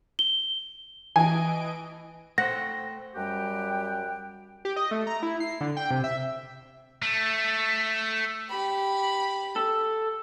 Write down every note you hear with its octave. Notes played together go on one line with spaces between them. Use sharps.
G7
E3 D#5 G#5 D7
A3 C5 F#5 G5 A#6
F#2 G3 G4 F#5 G5
G4
D#5
A3
A#5
E4
C7
D3
G5
C3
E5
A3
G4 B5
A4